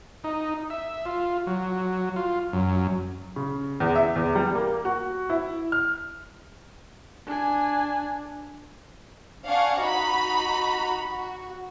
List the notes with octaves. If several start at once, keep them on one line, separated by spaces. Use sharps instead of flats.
D#4
E5
F4
F#3
F4
F#2
C#3
E2
E5
E2
G3
A#3
F#4
E4
F6
D4 G#5
D4 F5 F#5 G#5 C#6
D#4 F#4 A#5 B5
F#4